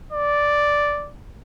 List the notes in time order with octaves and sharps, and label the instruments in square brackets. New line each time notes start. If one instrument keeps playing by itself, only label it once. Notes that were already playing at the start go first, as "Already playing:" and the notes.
[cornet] D5